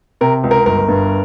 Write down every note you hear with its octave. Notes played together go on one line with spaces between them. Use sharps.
C3 A#4
C#2
A#4
G1 A#4
G2